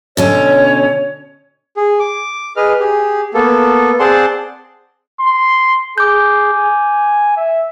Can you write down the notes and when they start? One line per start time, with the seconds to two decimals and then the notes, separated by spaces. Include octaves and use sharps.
0.17 B2 D3 C#4 C#5
1.77 G#4
1.99 D6
2.56 G#4 B4 D#5 F6
2.80 G4 G#4
3.34 A#3 B3 A4
4.00 C4 G#4 D5 F#5 A5 C6
5.20 C6
5.98 G#4 D6 G6
6.53 G#5
7.37 E5